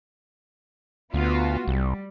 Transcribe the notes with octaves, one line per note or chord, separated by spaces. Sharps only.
D2 B3 F4 F#4
C2 G3